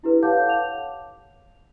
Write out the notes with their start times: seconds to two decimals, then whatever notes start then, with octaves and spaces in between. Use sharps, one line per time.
0.03 D4 E4 G4 A4 B4
0.23 C#5 F5 F#5 A5 D6 G6
0.49 F7